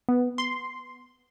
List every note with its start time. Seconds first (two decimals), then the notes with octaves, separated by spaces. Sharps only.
0.09 B3
0.38 C6